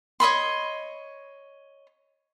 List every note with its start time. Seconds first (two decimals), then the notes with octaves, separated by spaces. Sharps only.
0.20 C#5 D#5 B5 C6